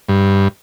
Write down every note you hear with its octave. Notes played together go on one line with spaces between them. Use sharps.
G2